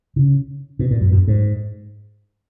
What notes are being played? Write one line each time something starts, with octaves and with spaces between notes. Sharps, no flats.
C#3
B2
A#2
F#2
F#2
G#2